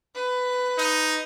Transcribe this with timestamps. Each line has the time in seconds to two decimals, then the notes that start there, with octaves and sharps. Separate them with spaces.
0.15 B4
0.78 D#4